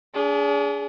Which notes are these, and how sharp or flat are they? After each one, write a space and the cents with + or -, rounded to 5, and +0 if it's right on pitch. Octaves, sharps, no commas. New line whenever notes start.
D4 -40 G#4 +0